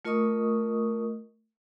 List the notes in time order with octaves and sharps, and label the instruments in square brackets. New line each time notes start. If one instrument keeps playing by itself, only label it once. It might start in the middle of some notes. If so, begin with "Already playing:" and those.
[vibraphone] A3 F4 A#4 D#5 C#6 D#6